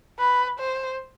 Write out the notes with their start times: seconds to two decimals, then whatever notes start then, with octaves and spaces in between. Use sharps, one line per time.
0.19 B4
0.59 C5